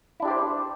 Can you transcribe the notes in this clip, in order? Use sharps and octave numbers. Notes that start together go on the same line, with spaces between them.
D4 E4 G4 C5 D5